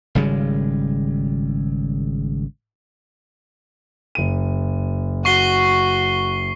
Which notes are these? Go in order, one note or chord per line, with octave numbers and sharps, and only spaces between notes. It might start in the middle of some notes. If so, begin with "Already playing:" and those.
G#1 C#3 G3 G#3
F#1 D#7
F#4 C#6 C7 G7